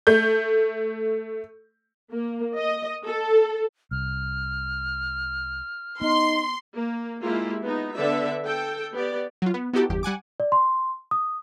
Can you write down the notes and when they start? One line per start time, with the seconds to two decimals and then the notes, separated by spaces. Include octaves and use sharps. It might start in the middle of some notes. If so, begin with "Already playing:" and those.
0.07 A3 G6
2.11 A#3
2.57 D#5
3.05 A4
3.91 C2 F6
6.01 B3 D#4 C6
6.75 A#3
7.22 G#3 A#3 E4 F4 G4
7.63 B3 D#4
7.96 D3 B3 A4 D5 E5
8.45 A4 G5
8.93 B3 G4 D5
9.42 F#3 F4
9.54 B3
9.73 B3 D#4 E4 F#4 G4 A4
9.90 G1 E2 G4
10.03 G3 F#5 G#5 D6
10.40 D5
10.52 C6
11.11 D#6